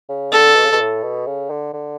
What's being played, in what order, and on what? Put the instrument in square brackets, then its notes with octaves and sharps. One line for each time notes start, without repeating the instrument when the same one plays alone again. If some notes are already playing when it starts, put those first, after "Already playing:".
[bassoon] C#3
[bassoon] D3 [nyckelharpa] A4
[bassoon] B2
C#3
B2
A2
B2
C#3
D3
D3